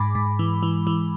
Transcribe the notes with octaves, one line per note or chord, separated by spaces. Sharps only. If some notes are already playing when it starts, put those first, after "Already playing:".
Already playing: G#2 G#3 B5 D6
G#2
E3
E3
E3